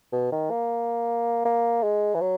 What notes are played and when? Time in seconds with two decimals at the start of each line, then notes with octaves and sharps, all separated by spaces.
0.13 B2
0.32 D#3
0.51 A#3
1.45 A#3
1.83 G#3
2.14 E3
2.21 F#3